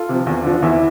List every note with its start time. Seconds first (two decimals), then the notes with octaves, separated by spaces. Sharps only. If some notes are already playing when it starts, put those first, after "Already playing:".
Already playing: F4 A4
0.09 C3 F3
0.27 E2
0.44 D3 F3
0.62 E2 E4